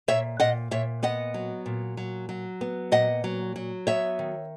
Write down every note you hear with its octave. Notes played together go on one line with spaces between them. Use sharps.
A#2 C#5 E5
A#2 D#5 F#5
A#2 C#5 E5
B3 D#5 F#5
F#3
A#2
F#3
F#3
B3
A#2 D#5 F#5
F#3
F#3
B3 C#5 E5
D#3